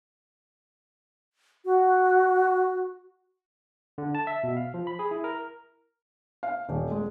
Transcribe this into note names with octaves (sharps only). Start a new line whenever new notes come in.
F#4
D3
A5
E5
B2
F5
F3
B5
G#4
E4
A#4
F5
D#1
G#3